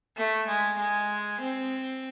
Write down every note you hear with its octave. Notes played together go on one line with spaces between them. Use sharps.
A3
G#3
G#3
C4